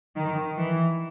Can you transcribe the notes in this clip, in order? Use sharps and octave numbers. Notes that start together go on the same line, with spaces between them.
D#3
E3